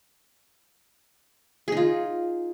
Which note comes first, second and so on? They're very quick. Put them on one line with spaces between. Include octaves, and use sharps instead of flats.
G#4 D#4 F4